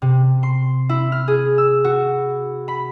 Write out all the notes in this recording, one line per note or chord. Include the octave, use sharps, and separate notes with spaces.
C3
C6
E4
F6
G#4
E6
F#4
B5